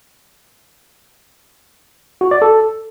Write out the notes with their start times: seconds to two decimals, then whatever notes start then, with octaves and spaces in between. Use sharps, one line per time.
2.21 F#4
2.31 D5
2.42 A4